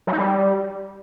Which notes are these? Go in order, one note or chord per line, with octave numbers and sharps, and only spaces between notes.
F#3
D#4
G3